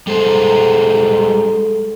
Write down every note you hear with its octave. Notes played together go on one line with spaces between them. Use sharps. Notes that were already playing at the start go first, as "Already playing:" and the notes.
G3 G#3 A4 C5